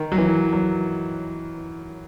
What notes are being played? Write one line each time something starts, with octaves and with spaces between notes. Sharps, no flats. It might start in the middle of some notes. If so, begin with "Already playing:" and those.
Already playing: D#3
F#3
E3
F#3